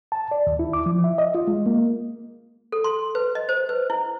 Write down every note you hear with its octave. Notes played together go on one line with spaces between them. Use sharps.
A5
D5
D#2
E4
D6
F3
E5
D#5
F4
G#3
A#3
A4
C6
B4
D#5
C5
B4
E4